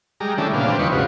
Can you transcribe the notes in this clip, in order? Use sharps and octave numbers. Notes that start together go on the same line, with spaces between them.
G3 G#3 A#5
D3 E3 G3 A3 C#4 D4
A#2 C#3 B3 D4 F5
D3 F3 G3 C4 D4
E2 D#4 B4 C5 C#6
G#2 C#3 F4 F#4